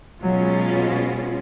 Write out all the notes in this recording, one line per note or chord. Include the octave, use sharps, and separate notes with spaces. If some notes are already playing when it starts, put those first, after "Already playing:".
B2 F#3 G#3 C#4 F4